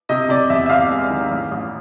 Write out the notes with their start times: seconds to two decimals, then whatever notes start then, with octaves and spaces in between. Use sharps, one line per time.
0.09 C3 D#5
0.29 C3 D5
0.50 E2 E5
0.66 E5
0.69 E2 F5
0.91 G#3
1.10 D#3
1.31 A1
1.51 A1